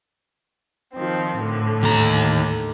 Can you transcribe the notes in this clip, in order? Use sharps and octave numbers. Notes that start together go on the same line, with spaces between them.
D#3 F3 C4
A2 D3
D#2 A#5